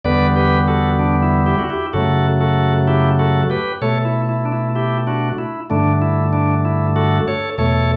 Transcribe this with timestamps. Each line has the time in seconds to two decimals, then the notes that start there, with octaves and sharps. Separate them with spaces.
0.05 E2 D3 G3 B3 B4 D5
0.36 G4 B4
0.68 F#4 A4
0.99 D4
1.22 E4
1.46 E4 G4
1.59 F#4
1.69 E4 G4
1.93 F#2 C#3 F#3 A3 F#4 A4
2.41 F#4 A4
2.87 E4 G4
3.19 F#4 A4
3.50 G4 B4
3.82 B2 A3 A4 C#5
4.05 E4
4.29 E4
4.45 D4
4.52 E4
4.75 E4 G4
5.07 D4 F#4
5.38 E4
5.70 G2 D3 A3 D4
6.02 E4
6.33 D4
6.65 E4
6.96 F#4 A4
7.27 A4 C#5
7.58 E2 B2 A3 A4 C#5